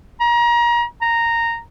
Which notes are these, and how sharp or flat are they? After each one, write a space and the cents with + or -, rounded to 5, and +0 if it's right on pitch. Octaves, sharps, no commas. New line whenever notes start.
A#5 +30
A#5 -10